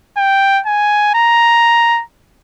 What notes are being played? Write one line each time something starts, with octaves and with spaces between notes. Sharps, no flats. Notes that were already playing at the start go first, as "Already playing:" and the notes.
G5
G#5
A#5